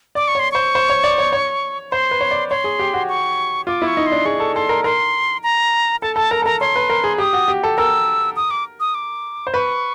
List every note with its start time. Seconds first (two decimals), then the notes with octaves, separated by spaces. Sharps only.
0.15 D5 D6
0.28 C#6
0.35 C#5 C6
0.52 C5 C#6
0.75 C5
0.90 C#5
1.04 D5
1.18 C#5
1.32 C#5
1.91 C5 C6
2.11 B4
2.21 C#5
2.31 D5
2.50 C#5 C6
2.64 G#4
2.79 G4
2.94 F#4
3.09 C#6
3.67 F4 D6
3.82 E4
3.87 C#6
3.97 D#4
4.07 C6
4.12 D4
4.25 G#4 C#6
4.40 A4
4.55 A4 C6
4.69 A#4
4.84 A#4 C6
5.43 A#5
6.02 A4 A5
6.16 A4 A5
6.31 A#4 A#5
6.42 A4
6.45 A#4 A#5
6.61 C#5 C6
6.76 B4
6.90 A#4
7.04 G#4
7.18 G4 D#6
7.33 F#4
7.48 G4
7.63 A4
7.77 A#4 E6
8.36 D#6
8.51 D6
8.80 D#6
8.95 D6
9.47 C5
9.54 B4 C#6